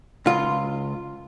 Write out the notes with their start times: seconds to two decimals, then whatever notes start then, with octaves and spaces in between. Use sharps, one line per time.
0.26 C#2 F4